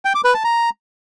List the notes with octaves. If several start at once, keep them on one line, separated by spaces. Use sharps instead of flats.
G5
D6
B4
A5
A#5